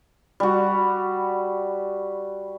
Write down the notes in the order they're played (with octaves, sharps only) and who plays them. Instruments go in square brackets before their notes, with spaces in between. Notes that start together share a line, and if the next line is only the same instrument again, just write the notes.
[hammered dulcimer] G3 F#4